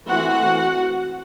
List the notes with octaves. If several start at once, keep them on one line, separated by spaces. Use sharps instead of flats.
E3 A3 C4 F#4 F#5